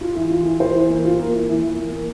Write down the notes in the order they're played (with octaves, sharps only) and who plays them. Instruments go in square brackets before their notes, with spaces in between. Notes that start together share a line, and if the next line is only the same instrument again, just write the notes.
[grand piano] F4
E3
F4
E3
C5
E3
A#3
F4
A#3
E3
E3
E3
A#3
A#3